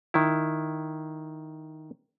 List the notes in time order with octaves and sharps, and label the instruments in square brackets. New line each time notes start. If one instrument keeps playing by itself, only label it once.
[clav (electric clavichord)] D#3 E4